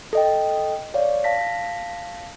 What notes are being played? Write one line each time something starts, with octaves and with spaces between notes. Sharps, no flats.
A4 D#5 G5
C#5 D5 F5
F5 A5 A#6 B6